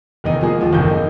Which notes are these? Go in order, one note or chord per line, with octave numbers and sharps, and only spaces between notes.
F1 E2 D#3 D#4 D#7
F3 G#3 A#3 G#4
D#2 F3
F#1 E2 A2 D#3 G6
D#4